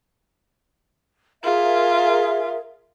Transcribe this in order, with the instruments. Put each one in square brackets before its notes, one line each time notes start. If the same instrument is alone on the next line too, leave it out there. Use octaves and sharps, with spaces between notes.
[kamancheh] F4 [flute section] G#4 A#4 E5